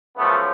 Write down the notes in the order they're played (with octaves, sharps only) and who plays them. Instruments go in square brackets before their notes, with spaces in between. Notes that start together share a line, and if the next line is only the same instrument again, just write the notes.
[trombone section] F#2 C#3 F3 A3 B3